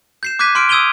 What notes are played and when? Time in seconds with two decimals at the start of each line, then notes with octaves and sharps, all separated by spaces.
0.23 G6 C7 E7
0.39 D6 F#6 G#6 B6 D#7
0.55 C6 F6 D7
0.69 D#6 E6 G#6 D#7 F7 G7